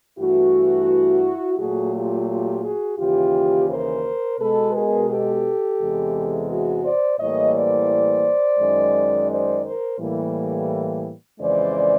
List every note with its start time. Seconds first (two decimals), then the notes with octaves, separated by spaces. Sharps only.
0.19 G2 E3 A3 E4 F#4
1.58 A#2 F#3 A3 F#4 G#4
1.94 F4 G4
2.29 F4 G4
2.64 F#4 G#4
2.99 D#2 C#3 E3 F4 G4
3.69 A#4 C5
4.39 B2 G#3 A4 B4
4.74 G#4 A#4
5.09 G4 A4
5.79 E2 C3 E3 G#3
6.49 F#4 G#4
6.84 C5 D5
7.20 A2 E3 G3 A#3 C#5 D#5
7.54 C5 D5
8.60 F#2 D#3 G#3
9.30 C5 D5
9.65 A#4 C5
10.00 A2 E3 G3 A#3
11.40 F2 C#3 E3 G#3 C5 D5